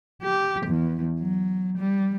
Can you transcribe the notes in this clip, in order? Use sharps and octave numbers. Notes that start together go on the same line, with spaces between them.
G4
E2
F#3
G3